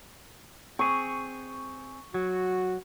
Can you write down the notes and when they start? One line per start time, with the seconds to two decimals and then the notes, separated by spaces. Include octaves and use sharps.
0.79 C4 G#4 C#6
2.14 F#3 F#4